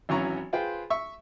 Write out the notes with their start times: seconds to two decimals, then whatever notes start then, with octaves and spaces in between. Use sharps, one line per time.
0.09 G#1 E3 F#3 C#4 A#5 C#6
0.53 F4 G#4 B4 C5 G5
0.90 E5 C#6